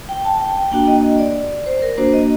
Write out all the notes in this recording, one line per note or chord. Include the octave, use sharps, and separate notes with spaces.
G5
A5
G5
G5
A#3 D4 F#4 G5
D#5
D5
C5
A#4
A#3 D4 F#4 C5
D#5